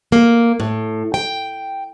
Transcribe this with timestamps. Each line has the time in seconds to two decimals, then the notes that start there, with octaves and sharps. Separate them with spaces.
0.12 A#3
0.60 A2
1.14 G5